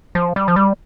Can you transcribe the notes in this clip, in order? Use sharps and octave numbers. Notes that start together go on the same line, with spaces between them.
F3
G3
F3
G3